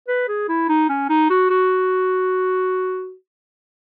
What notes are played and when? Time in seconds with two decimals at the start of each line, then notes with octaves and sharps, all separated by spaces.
0.08 B4
0.28 G#4
0.48 E4
0.69 D#4
0.89 C#4
1.09 D#4
1.30 F#4
1.50 F#4